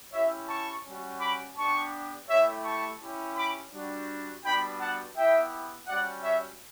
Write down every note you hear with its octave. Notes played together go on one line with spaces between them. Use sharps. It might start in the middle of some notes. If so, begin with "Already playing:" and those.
C#4 E4 G4 C#5 E5
A5 C#6
G3 C#4 F#4
B5 D6
B3 D4 G4 A5 C#6
A3 E4 G4 C#5 E5
A5 C#6
C#4 E4 G4
B5 D6
G3 D4 F#4
G3 B3 D4 F#4 G5 B5
F#5 A5
B3 E4 G4 E5 G5
G3 C#4 F#4 D5 F#5
C#5 E5